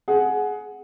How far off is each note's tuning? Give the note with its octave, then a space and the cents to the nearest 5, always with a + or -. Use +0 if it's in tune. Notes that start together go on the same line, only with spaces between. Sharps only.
G#4 +20 F#5 +0